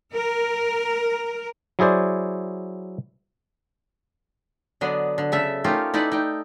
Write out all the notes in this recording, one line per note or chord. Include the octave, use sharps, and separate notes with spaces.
A#4
F#3 E4 G#4 C5 D5
D3 F#3 B3 D4 D#5
D3
C#3 A4 E5
A3 C#4 D#4 F4 G4 A#4
D#4 E4 A4 B4 D5
D#4 G5